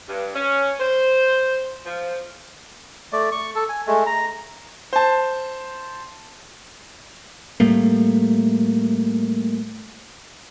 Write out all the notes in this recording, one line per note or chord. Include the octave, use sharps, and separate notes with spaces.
G2
C#4
C5
F3
A3 D5
C#6
A4
G#5
G#3 A3
A#5
C5 A5
A2 G3 A3 A#3